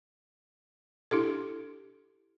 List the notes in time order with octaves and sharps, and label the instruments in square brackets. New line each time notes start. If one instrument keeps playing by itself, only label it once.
[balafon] D4 E4 G4 A4